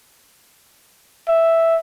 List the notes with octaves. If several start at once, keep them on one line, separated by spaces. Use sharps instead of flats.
E5